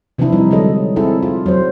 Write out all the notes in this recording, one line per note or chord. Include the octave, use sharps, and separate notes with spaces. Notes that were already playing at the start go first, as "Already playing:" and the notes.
C3 E3 F3 C4 D4 E4
G3 D#4
D3 F#3 G#3 A4 D#5
C4 D#4 E4 G#4 A4
F4
F#3 C5